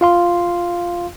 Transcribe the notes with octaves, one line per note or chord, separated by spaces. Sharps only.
F4 F5 C6